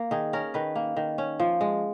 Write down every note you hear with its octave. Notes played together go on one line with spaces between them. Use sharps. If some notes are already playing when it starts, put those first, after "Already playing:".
Already playing: A#3
D#3 G#4
C#4 A#4
D#3 B4
A#3
D#3
C#4
F3
G#3